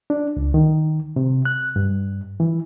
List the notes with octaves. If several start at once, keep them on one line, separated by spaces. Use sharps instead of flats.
D4
C#2
D#3
C3
F#6
G2
E3